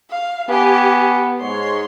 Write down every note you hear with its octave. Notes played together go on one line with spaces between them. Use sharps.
F5
B3 G4 G#5
G#2 C#5 C6